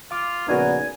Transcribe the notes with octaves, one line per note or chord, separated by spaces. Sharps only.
F4 F5 D6
A#1 C#3 B3 D#4 F#4 A#4 D5 G#5